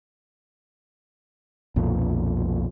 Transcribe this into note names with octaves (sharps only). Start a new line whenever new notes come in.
B1 F2 A#2